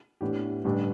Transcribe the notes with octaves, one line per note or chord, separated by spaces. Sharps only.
A2 E3 B3 D4 G4
A1 G2 D3 G3 D4